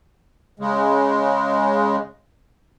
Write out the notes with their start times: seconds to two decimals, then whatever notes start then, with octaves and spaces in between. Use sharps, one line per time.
0.59 C#3 G#3